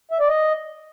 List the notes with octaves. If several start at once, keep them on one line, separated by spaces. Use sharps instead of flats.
E5
D5
D#5